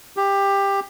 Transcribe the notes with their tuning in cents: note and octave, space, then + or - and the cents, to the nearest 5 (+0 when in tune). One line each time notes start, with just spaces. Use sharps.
G4 +15